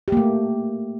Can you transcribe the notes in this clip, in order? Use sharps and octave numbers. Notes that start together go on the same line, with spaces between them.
A3 A#3 G4